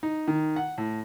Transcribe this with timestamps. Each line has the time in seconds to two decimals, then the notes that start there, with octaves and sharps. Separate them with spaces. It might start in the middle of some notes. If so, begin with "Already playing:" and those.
0.03 D#4
0.28 D#3
0.56 F#5
0.78 A2